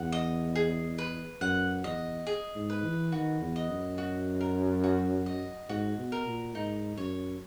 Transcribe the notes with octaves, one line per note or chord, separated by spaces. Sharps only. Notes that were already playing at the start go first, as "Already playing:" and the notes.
Already playing: E2 F#5
D#5
G#4
B4
F#2 F#5
E2 D#5
G#4
G#2
B4
E3
D#3 F#4
E2
D#5
F#2
F#4
A#4
F#4
D#5
G#2 F#4
B2
A#4
A#2
G#2 D#4
F#2 C#5